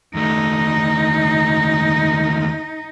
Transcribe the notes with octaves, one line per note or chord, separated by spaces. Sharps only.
D#2 A3 D#4